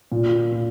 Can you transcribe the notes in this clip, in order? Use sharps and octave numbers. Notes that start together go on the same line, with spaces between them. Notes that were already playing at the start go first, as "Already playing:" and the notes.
A#2
A#2